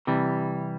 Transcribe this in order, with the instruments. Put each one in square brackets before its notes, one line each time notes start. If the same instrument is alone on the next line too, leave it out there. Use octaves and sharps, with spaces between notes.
[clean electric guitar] C3 E3 G3